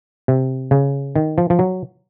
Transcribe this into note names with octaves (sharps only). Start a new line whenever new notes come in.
C3
C#3
D#3
F3
F3
F#3